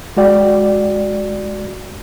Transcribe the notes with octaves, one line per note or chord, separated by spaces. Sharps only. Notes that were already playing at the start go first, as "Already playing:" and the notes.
G#3 F#4 D5 G5